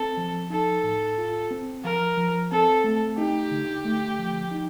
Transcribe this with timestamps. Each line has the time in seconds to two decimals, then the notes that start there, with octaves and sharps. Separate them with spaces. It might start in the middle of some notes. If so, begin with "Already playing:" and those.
Already playing: C4 A4
0.17 F3
0.50 D#4 A4
0.83 A2
1.18 F4
1.51 C4
1.84 F3 A#4
2.17 F3
2.51 C4 A4
2.84 A3
3.18 D#4 G4
3.51 D3
3.85 A3
4.19 F3
4.51 D#4